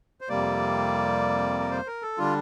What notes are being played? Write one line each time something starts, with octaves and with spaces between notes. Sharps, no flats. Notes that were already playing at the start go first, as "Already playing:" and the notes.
C5
F2 C3 G3 A#3 D5
A#4
C5
A#4
A4
D3 G3 D4 F4